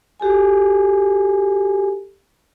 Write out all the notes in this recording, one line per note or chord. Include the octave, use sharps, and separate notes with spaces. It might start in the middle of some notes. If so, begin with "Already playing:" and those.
F#4 G4 A4 G#5